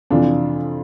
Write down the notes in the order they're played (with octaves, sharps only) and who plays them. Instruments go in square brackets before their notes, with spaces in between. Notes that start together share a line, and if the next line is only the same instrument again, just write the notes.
[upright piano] F2 C3 E3 D4 F4